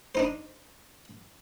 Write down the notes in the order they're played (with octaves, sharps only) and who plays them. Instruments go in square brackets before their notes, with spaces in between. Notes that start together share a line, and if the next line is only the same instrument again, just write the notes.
[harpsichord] D4 D#4 C5